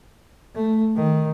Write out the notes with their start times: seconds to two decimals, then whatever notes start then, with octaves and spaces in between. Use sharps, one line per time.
0.55 A3
0.96 D#3